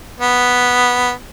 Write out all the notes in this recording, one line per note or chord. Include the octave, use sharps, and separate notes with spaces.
B3